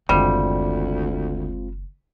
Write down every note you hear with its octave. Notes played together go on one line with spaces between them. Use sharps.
F#1 D2 D#3 G3 G#3 C4 F4